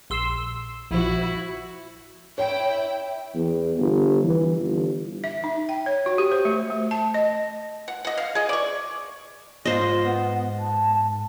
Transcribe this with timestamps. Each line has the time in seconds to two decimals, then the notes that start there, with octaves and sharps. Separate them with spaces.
0.10 A#1 C6 E6
0.91 A#1 F3 E4 F#4
2.38 E4 C#5 G5
3.34 E2
3.78 G1
4.24 E3
4.59 G1
5.24 E5
5.44 D#4
5.69 G5
5.86 C#5
6.06 F#4
6.18 G4
6.32 C5
6.45 A3
6.70 A3
6.91 A5
7.14 D#5
7.88 F#5
8.05 D#5 F#5
8.18 F5
8.35 G#4 D#5
8.49 D5 C#6
9.65 G#2 F4 C5 D#5
10.03 B3
10.59 A5